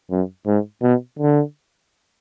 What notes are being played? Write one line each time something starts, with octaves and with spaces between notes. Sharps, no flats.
F#2
G#2
B2
D3